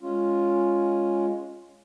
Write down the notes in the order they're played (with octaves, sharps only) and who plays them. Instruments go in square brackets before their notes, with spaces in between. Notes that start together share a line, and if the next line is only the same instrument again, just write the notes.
[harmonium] G#3 C#4 F4